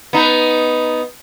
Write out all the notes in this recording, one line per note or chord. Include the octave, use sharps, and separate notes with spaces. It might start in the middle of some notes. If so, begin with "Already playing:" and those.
B3 D#4